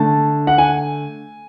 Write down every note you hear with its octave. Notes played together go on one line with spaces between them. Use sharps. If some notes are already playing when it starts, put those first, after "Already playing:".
Already playing: D3 A3 A5
F#5
G#5